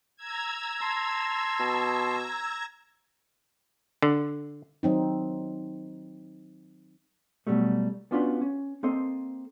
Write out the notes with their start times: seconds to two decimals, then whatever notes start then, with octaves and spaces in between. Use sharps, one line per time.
0.16 A#5 E6 G#6
0.81 A5 C6
1.59 B2
4.02 D3
4.83 D#3 F#3 C4 D#4
7.47 B2 D3 F#3 G3 A3
8.11 B3 C#4 D4 F4 F#4 B4
8.41 C#4
8.83 A#3 C4 A4 C5 D#5